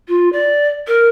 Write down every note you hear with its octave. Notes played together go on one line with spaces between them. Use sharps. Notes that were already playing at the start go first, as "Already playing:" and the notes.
F4
D5
A#4